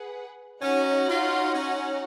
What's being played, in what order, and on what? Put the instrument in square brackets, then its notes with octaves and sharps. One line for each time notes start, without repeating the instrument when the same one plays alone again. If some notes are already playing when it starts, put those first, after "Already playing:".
Already playing: [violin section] G#4 B4 F#5
[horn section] C#4 [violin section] D#4 F#4 C#5 F#5
[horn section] F4
C#4